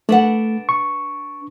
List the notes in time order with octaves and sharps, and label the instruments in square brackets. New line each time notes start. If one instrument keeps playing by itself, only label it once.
[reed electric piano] A3 [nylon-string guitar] D4 B4 F#5
[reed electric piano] C#6